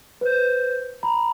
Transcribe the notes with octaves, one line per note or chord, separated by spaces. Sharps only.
B4 C5 G6
A#5 B5